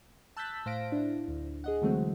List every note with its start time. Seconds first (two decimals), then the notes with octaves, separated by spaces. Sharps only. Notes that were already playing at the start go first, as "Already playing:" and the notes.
0.37 A5 E6 F#6 G6 A6 B6
0.66 A2 C5 F5 A#6 D7
0.92 D4 E4
1.28 D2
1.64 G#4 D#5 F#5
1.82 D3 E3 F#3 G#3 A3 C4